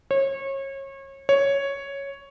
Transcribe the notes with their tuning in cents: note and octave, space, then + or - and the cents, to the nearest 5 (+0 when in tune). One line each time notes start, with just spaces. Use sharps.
C#5 -30
C#5 +0